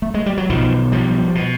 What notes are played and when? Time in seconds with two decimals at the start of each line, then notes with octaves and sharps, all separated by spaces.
0.02 A3
0.14 G#3
0.26 G3
0.37 F#3
0.49 B1 B2 D#3 F3
0.92 F3 G3
1.35 B2